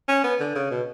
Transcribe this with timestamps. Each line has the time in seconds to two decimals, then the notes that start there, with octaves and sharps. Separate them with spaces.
0.09 C#4
0.24 B3
0.40 D3
0.55 C#3
0.71 B2